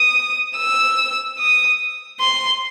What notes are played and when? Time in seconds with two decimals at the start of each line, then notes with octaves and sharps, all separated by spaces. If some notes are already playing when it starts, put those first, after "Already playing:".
Already playing: D#6
0.58 E6
1.39 D#6
2.20 C6